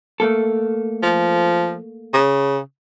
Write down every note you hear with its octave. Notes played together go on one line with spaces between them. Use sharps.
A3 A#3 A4
F3
C#3